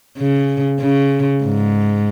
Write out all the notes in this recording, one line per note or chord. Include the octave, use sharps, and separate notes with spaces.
C#3
C#3
G#2